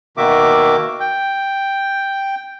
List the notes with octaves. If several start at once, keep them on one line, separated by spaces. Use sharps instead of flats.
B2 D#3 A#3 F#4 E5 D6
G5